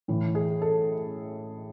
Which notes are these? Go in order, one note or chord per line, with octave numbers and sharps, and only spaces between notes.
A2 E3
G#4
A4